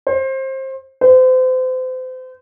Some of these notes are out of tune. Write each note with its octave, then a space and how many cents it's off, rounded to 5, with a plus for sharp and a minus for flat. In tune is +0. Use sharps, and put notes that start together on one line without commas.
C5 +25
C5 -35